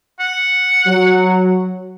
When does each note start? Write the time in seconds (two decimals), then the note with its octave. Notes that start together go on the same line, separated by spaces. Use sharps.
0.20 F#5
0.86 F#3